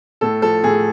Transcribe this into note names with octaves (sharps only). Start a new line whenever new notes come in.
A2 A4
F3 A4
A2 G#4